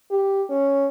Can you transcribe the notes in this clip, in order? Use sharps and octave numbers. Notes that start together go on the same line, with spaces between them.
G4
C#4